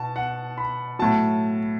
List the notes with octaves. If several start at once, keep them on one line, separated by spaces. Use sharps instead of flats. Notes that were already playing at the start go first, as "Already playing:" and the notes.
Already playing: B2 A5
F#5
B5
A2 F#3 A5